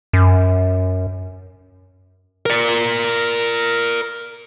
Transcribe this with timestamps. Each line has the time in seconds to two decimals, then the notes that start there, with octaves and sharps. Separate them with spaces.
0.13 F#2
2.46 A#4 D5